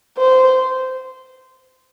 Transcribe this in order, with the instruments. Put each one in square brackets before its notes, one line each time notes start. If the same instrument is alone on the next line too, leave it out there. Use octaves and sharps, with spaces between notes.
[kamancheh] C5